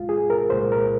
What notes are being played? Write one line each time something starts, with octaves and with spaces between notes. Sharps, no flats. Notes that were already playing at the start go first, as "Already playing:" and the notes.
Already playing: C2 A#2 G#3 F4
G#4
A#4
C2 A#2 G#3 C5
A#4